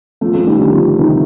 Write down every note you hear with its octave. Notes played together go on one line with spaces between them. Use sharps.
F3 A3
F3 A3
D#3 G3
D3 F3
D3 F3
C3 D#3